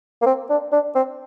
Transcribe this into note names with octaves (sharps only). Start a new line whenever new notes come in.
A#3
C4
D4
D4
C4